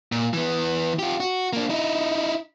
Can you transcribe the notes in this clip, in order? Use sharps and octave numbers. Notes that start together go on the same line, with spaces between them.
A#2
E3 B3
F4 G4
F#4
A#3 D4
D#4 E4